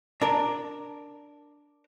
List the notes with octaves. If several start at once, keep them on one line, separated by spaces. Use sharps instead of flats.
D4 A#4 A#5